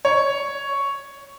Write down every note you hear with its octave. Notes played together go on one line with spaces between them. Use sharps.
C#5